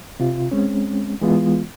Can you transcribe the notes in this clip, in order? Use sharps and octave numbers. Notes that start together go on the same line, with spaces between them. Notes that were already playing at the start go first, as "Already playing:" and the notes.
C3 F4
G#3 C4 C#4
E3 G#3 B3 F4